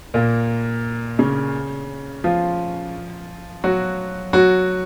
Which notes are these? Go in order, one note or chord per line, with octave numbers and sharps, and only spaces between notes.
A#2 A#3
C#3 C#4
F3 F4
F#3 F#4
F#3 F#4